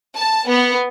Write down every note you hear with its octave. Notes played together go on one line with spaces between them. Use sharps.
A5
B3